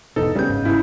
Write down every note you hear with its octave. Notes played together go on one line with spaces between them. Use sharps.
G1 E2 B2 D#4 A4
C#3 G3 A#3 B3 G6
G1 G#2
C#3 E4